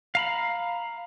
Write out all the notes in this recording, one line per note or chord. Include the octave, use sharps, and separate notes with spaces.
F5 A#5 B5